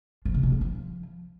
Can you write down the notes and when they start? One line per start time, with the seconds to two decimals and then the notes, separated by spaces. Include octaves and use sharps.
0.25 F3
0.34 C3
0.43 B2
0.52 B3
0.61 F3